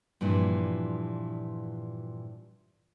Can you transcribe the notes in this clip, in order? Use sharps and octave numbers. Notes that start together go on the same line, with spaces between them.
G2 A#2 E3 F3